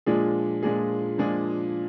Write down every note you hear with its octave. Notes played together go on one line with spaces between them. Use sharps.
A#2 F3 G#3 D4 G#4
A#2 F3 G#3 D4 G#4
A#2 F3 G#3 D4 G#4